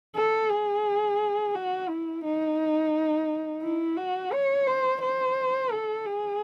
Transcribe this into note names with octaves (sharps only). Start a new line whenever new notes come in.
A4
G#4
F#4
E4
D#4
E4
F#4
C#5
C5
C5
A4
G#4